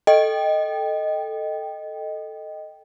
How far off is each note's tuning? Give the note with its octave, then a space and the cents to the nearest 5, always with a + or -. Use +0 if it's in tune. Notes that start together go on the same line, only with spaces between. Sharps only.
A4 +0 D#5 +0 G5 +0